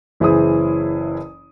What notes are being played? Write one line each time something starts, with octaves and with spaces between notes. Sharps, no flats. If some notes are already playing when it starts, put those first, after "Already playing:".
F#1 E3 E4 G#4 C5 D#6